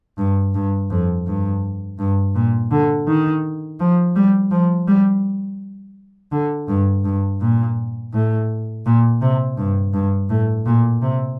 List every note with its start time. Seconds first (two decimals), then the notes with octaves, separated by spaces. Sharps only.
0.18 G2
0.54 G2
0.90 F2
1.27 G2
1.99 G2
2.35 A#2
2.71 D3
3.07 D#3
3.80 F3
4.16 G3
4.51 F3
4.88 G3
6.32 D3
6.68 G2
7.05 G2
7.41 A#2
8.13 A2
8.86 A#2
9.21 C3
9.57 G2
9.93 G2
10.29 A2
10.66 A#2
11.02 C3